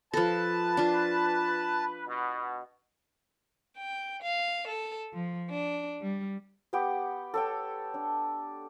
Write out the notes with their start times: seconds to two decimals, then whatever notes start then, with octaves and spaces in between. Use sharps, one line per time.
0.13 F3 A4 B4 A5
0.77 D4 F4
2.07 B2
3.78 G5
4.23 F5
4.68 A4
5.13 F3
5.50 D4
6.02 G3
6.73 B3 G4 F#5 G5
7.34 A4 C#5 G5
7.94 D4